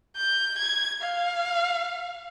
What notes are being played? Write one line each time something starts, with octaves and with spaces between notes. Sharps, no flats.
G6
G#6
F5